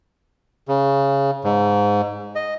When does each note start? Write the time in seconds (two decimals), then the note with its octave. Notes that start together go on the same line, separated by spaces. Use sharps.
0.68 C#3
1.44 G#2
2.36 D#5